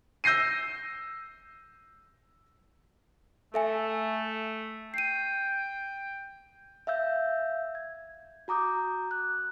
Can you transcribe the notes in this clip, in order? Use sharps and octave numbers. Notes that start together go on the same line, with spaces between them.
E6 G6 A#6 C7 D#7
A3 A4 E5 G#5
G5 C7 D#7
E5 F5 E6 G6
G#6
F#4 A#5 D6 D#6 G6
F#6